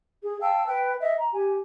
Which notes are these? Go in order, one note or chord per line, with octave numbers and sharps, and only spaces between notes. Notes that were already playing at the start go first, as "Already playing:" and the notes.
G#4
F5 G5 A5 E6
B4 G5
D#5 E5
A#5
G4 G#5